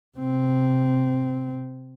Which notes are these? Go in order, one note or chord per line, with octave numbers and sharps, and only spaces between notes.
C3 C4